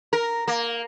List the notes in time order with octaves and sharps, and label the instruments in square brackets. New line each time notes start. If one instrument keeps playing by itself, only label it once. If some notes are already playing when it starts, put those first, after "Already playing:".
[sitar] A#4
A#3